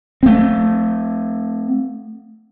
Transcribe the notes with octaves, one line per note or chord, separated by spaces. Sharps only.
A3 C4